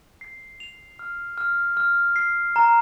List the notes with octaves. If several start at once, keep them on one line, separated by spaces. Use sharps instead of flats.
C7
F7
F6
F6
F6
C7
A#5